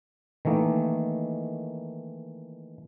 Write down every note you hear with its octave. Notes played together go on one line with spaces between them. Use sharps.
D#3 E3 A3 A#3 D#4